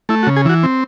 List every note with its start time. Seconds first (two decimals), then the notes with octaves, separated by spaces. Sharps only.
0.09 A3 E4
0.23 F#4
0.27 C#3
0.36 G#4
0.45 E3 F#4
0.63 C4